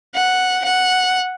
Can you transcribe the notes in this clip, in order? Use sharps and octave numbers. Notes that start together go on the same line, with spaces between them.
F#5
F#5